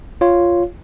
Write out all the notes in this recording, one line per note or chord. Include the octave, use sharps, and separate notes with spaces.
F4 C#5 F5